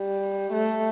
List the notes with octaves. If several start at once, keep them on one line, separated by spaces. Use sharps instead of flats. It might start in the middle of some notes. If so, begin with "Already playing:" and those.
Already playing: G3
A3